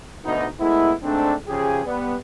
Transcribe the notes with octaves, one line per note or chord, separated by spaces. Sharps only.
D2 B2 B3 D#4
G#3 A3 B3 E4
G#2 A3 C4 D4
C#3 F3 G4 G#4
G3 B3